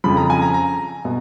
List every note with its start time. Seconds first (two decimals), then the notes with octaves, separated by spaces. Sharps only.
0.04 F2 C#3 F3 B5
0.17 A#5
0.30 G#5
0.42 A#5
0.54 A#5
1.05 B2